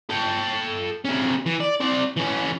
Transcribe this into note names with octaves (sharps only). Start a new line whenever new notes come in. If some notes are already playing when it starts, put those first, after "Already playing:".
A4 G5
C3 C#4
E3
D5
C4 D5
E3 C#4